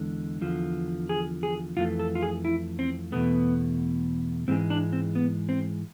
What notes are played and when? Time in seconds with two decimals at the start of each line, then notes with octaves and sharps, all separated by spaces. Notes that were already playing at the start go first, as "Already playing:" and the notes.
Already playing: E2 D3 G#3
0.41 E2 D3 F3
1.09 G#4
1.43 G#4
1.77 F2 E3 A3 F4
1.99 A4
2.15 F4
2.23 G#4
2.45 E4
2.79 C4
3.12 E2 B2 A3 B3
4.48 G#2 E3 G#3 C4
4.70 D4
4.93 C4
5.15 B3
5.49 C4